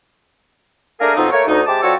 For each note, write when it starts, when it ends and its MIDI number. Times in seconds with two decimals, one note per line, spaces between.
1.00 1.12 57
1.00 1.12 58
1.00 1.12 62
1.00 1.12 68
1.00 1.12 70
1.16 1.30 41
1.16 1.30 47
1.16 1.30 53
1.16 1.30 60
1.16 1.30 63
1.31 1.45 57
1.31 1.45 58
1.31 1.45 70
1.31 1.45 73
1.47 1.62 38
1.47 1.62 63
1.66 1.80 48
1.66 1.80 56
1.66 1.80 67
1.66 1.80 81
1.66 1.80 86
1.82 1.94 53
1.82 1.94 60
1.82 1.94 66
1.82 1.94 69
1.82 1.94 73
1.82 1.94 74